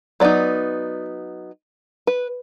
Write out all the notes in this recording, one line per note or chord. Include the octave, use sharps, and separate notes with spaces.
F#3 B3 D#4 D5
B4